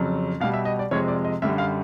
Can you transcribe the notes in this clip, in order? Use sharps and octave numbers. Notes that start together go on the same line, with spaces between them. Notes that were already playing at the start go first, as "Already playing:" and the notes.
Already playing: F2 C#3 F#3
B2 G3 F5
E5
D#5
D5
F2 C3 F3 G#3 C#5
D5
D#5
F#2 D3 G3 E5
F5